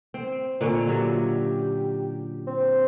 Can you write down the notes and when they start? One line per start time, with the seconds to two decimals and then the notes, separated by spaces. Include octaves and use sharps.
0.14 C4
0.61 A#2 D3 C#4
0.87 F#3 F4 G4 E5
2.47 C4